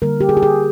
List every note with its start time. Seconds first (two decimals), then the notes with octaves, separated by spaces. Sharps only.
0.02 D3 G3 A#3 A#4
0.20 G4
0.29 G#4
0.37 G4
0.43 G#4